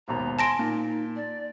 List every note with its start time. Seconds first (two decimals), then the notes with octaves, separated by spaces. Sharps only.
0.08 G#1 D#2 B2 A#5
0.39 G#5 A5 C6 A#6 D7
0.59 A#2 D#4
1.16 D5